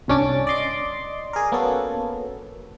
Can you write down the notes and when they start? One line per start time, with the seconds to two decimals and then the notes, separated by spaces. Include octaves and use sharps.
0.08 C2 G2 C#4 D4 D6 A6
0.47 D5 D#5 C6 D6
1.33 G#4 A#4
1.52 A#3 B3 C#4 F#4 A4